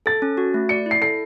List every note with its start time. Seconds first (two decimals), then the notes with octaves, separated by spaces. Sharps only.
0.06 A4 A6
0.22 C#4
0.37 F#4
0.54 A3
0.69 D5 C#7
0.86 E4 C7
1.02 A4 C7